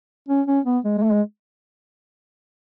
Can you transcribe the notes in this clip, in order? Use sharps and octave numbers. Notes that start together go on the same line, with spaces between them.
C#4
C#4
B3
G#3
G#3
A3
G#3